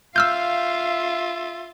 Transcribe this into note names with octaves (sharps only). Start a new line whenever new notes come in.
F4 E5 F5 E6 F6 G6